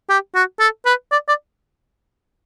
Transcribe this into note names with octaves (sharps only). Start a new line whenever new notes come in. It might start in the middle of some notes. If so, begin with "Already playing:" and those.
G4
F#4
A4
B4
D5
D5